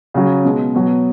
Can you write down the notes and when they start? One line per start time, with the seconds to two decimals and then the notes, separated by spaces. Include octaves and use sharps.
0.14 C#3 F#3
0.45 B2 G#3
0.75 B2 F#3